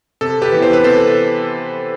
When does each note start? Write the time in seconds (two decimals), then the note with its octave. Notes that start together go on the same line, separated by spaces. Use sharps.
0.21 C3 A4
0.42 G4 B4
0.52 E3 B3 E4
0.62 C5
0.73 B4
0.83 C3 A4 C5